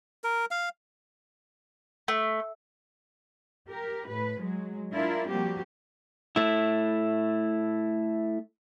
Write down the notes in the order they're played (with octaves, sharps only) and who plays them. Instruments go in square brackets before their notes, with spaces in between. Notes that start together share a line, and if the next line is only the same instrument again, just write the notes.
[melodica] A#4
F5
[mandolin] A3
[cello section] G4 A#4
A2 B4
F#3 G#3
D4 E4 F4 A#4 D5
F3 G3 A#3 C4 F#4 G4
[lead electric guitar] A3 E4